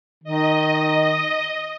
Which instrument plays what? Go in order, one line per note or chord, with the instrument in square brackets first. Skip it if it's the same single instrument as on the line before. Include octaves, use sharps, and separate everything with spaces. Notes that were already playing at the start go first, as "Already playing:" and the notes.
[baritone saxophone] D#3 [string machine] D#5